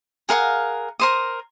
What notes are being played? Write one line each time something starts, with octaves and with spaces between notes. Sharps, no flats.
G#4 A#4 F5 F#5
A#4 C5 D#6